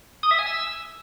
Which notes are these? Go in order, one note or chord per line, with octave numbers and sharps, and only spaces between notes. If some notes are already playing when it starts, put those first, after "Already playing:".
D#6
E5
G#5
E6